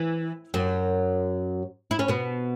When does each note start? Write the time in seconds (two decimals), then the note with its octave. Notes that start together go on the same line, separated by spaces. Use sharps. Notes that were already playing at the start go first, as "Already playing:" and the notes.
Already playing: E3
0.54 F#2 F#3
1.91 E4
1.99 C#4
2.08 B2 B3